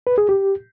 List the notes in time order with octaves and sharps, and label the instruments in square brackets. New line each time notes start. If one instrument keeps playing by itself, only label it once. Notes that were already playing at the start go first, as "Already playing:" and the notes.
[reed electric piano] B4
G#4
G4